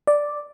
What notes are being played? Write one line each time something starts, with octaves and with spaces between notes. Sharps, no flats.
D5